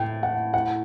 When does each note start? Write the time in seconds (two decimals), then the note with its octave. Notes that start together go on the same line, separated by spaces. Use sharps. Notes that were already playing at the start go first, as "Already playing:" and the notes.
Already playing: A2 G5
0.23 F#5
0.54 F#5